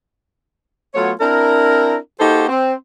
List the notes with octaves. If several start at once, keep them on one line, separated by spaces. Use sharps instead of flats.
F#3 A3 B3 F4 C#5
C4 D4 E4 A#4
A#3 D#4 F#4 G4 A4 C5
C4